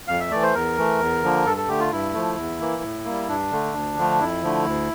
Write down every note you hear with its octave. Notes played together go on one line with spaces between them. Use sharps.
F2 F5
E5
E3 A3 D5
C5
E2 A#4
E3 A3
E2
D3 F3 A#3
G2 A4
A4
D3 A3 G4
F4
G2 E4
F3 A3
E2
E3 A#3
A2
G3 A#3
G2 D4
D3 A3
D2
D3 F3 A3
F2 E4
D3 F3 A3
D2